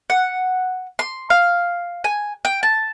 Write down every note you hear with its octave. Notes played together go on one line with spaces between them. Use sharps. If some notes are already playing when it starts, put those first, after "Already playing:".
F#5
C6
F5
G#5
G5
A5